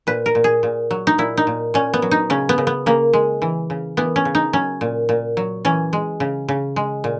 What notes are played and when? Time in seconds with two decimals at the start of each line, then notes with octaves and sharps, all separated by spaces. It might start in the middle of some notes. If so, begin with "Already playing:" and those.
0.07 A#2 B4
0.26 A#4
0.35 A#2
0.44 G#4
0.63 A#2
0.91 F#3
1.07 D#4
1.18 A#2 E4
1.37 D#4
1.47 A#2
1.74 A#2 C#4
1.94 B3
2.02 F#3
2.11 D#4
2.30 C#3 C#4
2.49 B3
2.58 C#3
2.67 B3
2.86 C#3 A#3
3.13 G#3
3.42 E3
3.70 C#3
3.97 E3 B3
4.16 C#4
4.25 C#3
4.35 D#4
4.53 F#3 C#4
4.81 A#2
5.09 A#2
5.37 F#3
5.65 E3 C#4
5.93 G#3
6.20 C#3
6.48 C#3
6.76 G#3
7.04 A#2